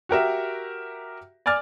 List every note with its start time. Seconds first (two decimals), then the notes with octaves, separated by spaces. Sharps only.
0.09 F#4 G4 A#4 E5
1.46 D5 G#5 D6 F6 A6